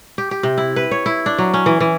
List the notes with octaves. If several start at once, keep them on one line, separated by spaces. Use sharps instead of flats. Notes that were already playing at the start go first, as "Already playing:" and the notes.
G4
G4
C3
E4
B4
C#5
E4
D4
F#3
C#4
E3
E3